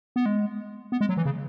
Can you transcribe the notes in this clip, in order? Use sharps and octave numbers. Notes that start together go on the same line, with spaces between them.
B3
G#3
B3
G#3
F#3
E3
C#3